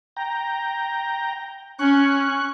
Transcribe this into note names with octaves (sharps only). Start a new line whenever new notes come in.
G5 A#5
C#4 C#6 F#6